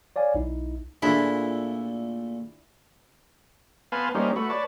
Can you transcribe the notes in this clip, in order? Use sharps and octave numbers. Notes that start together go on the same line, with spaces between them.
C#5 D5 F5 G#5
B1 D#4 E4
A#2 A3 D4 E4 F4 G#4
B3 B4 F5 G#5 A5 C6
G3 A#3 C#4 D#4 C5
A3 F#4 B4
B4 C#5 D5 A5